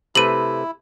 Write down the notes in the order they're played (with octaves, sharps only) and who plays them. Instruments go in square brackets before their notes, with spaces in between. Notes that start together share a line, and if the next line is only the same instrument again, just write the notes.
[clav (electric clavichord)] C3 A3 B4 [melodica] E4 [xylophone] D#7 F#7